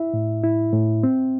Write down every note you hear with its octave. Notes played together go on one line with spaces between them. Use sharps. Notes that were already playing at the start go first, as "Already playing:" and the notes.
Already playing: E4 E5
A2
E4
A2
C4